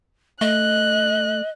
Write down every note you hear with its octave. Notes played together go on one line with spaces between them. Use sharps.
A3 D#5 F#6